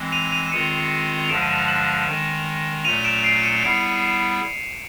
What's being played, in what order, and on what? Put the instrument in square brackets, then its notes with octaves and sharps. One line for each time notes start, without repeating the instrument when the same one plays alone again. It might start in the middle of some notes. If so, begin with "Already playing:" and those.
Already playing: [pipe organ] E3 G#3 C4
[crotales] D#7 F7
D#7 F7
E7
[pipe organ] D#3 G#3 C4 F4 G#4 [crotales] C#7 D#7
[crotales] F7
[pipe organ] G2 D3 F3 G#3 [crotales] D7 E7
[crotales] D#7
E7
F7
E7 F#7
[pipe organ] D#3 G#3 C#4
[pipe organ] A#2 F#3 A3 C#4 F4 [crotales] D#7 F7
[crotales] D7 E7
C7 D7
C#7 D#7
[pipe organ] G3 B3 E4 G#4 [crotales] C7 D7